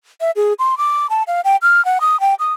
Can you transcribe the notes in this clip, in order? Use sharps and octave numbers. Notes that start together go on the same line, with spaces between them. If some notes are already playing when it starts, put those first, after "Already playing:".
E5
G#4
C6
D6
A5
F5
G5
F6
F#5
D#6
G5
D#6